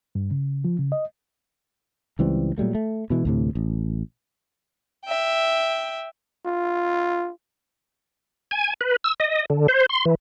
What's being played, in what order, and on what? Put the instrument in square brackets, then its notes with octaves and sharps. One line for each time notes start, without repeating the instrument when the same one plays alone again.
[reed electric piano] G2
C#3
F3
C#3
D#5
[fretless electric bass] C#2 E3 G3 C4
A#2 F#3 G3 A3
A3
B2 E3 G#3
D2 A2 C3
A1
[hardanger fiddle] E5 G5
[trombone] F4
[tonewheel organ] G#5
B4
E6
D#5
D3
C5
C6
E3